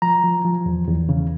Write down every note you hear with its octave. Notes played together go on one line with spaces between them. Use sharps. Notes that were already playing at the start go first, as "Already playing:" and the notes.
F3 A#5
F3
F3
E2
E2
C#3